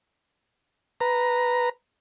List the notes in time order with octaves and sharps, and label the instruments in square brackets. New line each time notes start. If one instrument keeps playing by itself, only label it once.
[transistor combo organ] B4 A#5